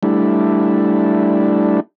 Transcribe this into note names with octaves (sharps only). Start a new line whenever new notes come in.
G3 A3 D4 E4